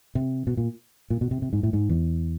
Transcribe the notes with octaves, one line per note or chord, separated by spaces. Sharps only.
C3
B2
A#2
A#2
B2
C3
C3
G#2
A2
G#2
E2